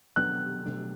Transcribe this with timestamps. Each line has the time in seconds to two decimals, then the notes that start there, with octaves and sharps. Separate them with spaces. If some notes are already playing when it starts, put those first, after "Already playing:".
0.16 B2 F#3 B3 D4 F#6
0.66 B2 F#3 A3 D4